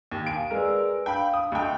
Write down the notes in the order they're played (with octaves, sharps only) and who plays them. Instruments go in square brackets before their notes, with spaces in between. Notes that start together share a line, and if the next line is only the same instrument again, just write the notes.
[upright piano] D#2
[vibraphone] F5 G#5 D#6 [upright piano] D7
[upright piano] G#3 A#4 [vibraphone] B4 D5 E6
[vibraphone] D4 F5 [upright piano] G5 B5
[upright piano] D#6
[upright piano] D2 G5 [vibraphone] D#5